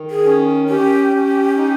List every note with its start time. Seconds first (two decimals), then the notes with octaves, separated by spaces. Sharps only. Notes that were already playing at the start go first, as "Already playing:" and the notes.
Already playing: D#3
0.11 G#4
0.25 C#4
0.69 C#4 G4
1.14 C#4
1.57 D#4